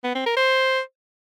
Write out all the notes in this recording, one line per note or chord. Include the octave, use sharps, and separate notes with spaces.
B3
C4
A#4
C5